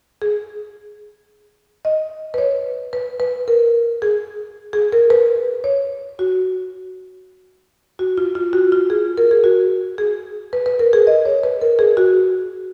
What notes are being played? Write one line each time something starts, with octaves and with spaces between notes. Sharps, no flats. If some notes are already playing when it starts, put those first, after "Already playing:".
G#4
D#5
B4
C#5
B4
B4
A#4
G#4
G#4
A#4
B4
C#5
F#4
F#4
F4
F4
F#4
F4
G#4
A#4
G#4
F#4
G#4
B4
B4
A#4
G#4
D#5
C#5
B4
A#4
G#4
F#4